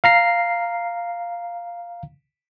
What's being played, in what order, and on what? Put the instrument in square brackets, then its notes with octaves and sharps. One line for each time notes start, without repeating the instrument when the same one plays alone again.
[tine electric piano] F5 A#5 C7